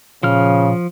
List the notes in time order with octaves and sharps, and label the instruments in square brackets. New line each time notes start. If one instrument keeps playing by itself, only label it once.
[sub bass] A#2 [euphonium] C#3 [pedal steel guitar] F3 F6